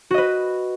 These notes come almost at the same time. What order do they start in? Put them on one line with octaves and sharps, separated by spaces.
F#4 D#5 B4